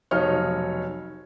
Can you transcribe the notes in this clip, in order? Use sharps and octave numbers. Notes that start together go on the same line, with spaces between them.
F1 B1 D#4 C#5 F6